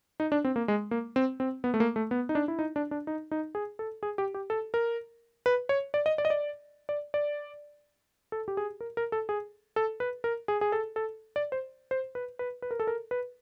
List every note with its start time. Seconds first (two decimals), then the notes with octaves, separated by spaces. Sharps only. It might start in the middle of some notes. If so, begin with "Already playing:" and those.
0.20 D#4
0.32 D4
0.44 C4
0.56 A#3
0.68 G#3
0.91 A#3
1.16 C4
1.40 C4
1.64 B3
1.74 A3
1.80 A#3
1.96 A3
2.11 B3
2.29 D#4
2.35 D4
2.48 E4
2.59 D#4
2.76 D4
2.91 D4
3.07 D#4
3.31 D#4
3.55 G#4
3.79 A4
4.03 G#4
4.18 G4
4.34 G4
4.50 A4
4.74 A#4
5.46 B4
5.69 C#5
5.94 D5
6.06 D#5
6.18 D5
6.25 D#5
6.30 D5
6.89 D5
7.14 D5
8.32 A4
8.48 G4
8.57 G#4
8.80 A#4
8.97 A#4
9.12 A4
9.29 G#4
9.76 A4
10.00 B4
10.24 A#4
10.48 G#4
10.61 G#4
10.72 A4
10.96 A4
11.36 D5
11.52 C5
11.91 C5
12.15 B4
12.39 B4
12.62 B4
12.71 A#4
12.80 A4
12.87 A#4
13.11 B4